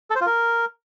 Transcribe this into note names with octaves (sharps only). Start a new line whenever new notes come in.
A4
C5
F4
A#4